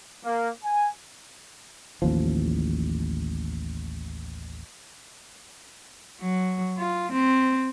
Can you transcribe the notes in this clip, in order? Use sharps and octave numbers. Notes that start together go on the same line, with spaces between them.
A#3
G#5
A1 D#2 F3
F#3
F4
C4